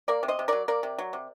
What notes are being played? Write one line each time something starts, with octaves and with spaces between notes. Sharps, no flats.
A#3 A#4 D5
C3
C5 D#5
C3
F#3 A#4 D5
A#3 A#4 D5
C3
F#3
C3